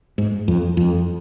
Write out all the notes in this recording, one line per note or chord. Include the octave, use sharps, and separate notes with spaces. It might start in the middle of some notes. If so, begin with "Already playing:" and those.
G#2
F2
F2